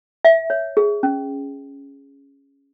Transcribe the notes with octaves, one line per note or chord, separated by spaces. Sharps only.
E5
C#5
G#4
C#4